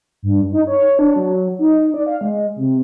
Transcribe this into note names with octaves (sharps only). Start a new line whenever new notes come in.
G2
D#4
C#5
D4
F#3
D#4
D5
F5
G#3
C3